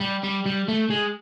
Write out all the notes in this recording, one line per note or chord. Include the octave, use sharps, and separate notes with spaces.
G3
G3
G3
A3
G#3